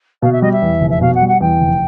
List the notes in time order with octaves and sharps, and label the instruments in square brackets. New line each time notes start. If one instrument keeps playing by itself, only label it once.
[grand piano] B2 [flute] F5
[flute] E5
[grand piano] G3 [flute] D#5
[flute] E5
[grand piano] E2
F1
[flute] E5
[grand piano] B2 [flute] F5
[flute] F#5
[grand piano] G3
[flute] F#5
[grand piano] E2 [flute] G5
[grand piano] F1